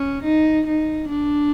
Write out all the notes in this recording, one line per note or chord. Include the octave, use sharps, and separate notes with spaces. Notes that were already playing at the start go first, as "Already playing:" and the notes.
Already playing: C#4
D#4
D#4
D4